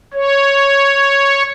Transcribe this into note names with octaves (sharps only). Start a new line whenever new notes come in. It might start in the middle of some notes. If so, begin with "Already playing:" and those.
C#5